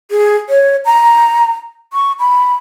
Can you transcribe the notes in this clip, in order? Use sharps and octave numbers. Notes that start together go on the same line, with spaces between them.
G#4
C#5
A#5
C#6
B5